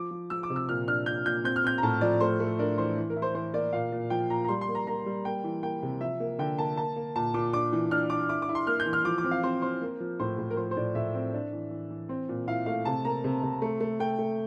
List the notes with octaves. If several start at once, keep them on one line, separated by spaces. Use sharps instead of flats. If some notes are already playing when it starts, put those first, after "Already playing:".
Already playing: F3 D6
F3
F3 E6
D6
C3
E6
A#2 F6
D4 F6
A#2 G6
A#2 G6
C4 G6
F6
C4 G6
A#5
A2 A5
F3 D5
A3 C5
A3
D4 A#4
E3 C5
E3
A#4
E4
C5
E3 C5
A#3 D5
A#2 F5
A#2
F3 G5
A#2 A#5
A#5
G3 C6
C6
A#3
A#5
A#3 A#5
G3
A#3 G5
E3
A#3 G5
C3
F3 E5
A#3
D3 G5
A#3 A5
A#3 A5
A#3
A#2 A5
A#2 D6
D4 D6
E3
D4 F6
D4 D6
E4 D6
D6
E4
C6
A#3 F6
G6
E3
F6
F3 D6
D6
C4
F5
C4 C5
C4 C5
A#3
F3
A2 C5
A2
A#4
F3 C5
C5
A2 D5
A2 E5
C4
D4
E3
E3
E3
C4
A#2
E4 F5
A3 F5
C3 A5
A#3 A#5
C3
C3
A3
A3
A3 G5
A3